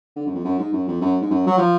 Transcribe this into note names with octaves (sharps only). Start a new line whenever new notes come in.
D3
F#2
F2
F#2
G#2
F#2
F2
F#2
G#2
F#2
F#3
F3